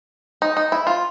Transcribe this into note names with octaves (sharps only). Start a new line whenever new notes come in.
D#4
D#4
E4
F4